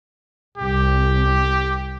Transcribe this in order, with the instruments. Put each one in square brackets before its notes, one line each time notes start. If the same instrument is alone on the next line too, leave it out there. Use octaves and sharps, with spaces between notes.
[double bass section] C2 [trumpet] G4